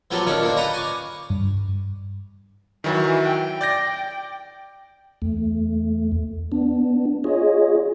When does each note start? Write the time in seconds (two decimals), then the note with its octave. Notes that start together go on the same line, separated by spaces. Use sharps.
0.11 F3 F#3 B3 C4 G4 A4
0.26 A#2 D#3 C#4 D4 A4
0.43 A#3 D4 C5
0.57 B4 D#5 F#5 A#5
0.73 G#5 C#6 D6
1.30 G2
2.84 D#3 E3 F#3 F#4
3.24 G5
3.61 D5 G6 A#6
5.22 E2 A3
6.52 B3 D4
7.24 F4 G#4 C#5 D#5